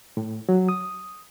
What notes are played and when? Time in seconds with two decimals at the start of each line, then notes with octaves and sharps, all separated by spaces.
0.17 A2
0.49 F#3
0.69 D#6